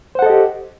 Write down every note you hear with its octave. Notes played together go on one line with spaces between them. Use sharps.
G4 A4 C5 D#5 F#5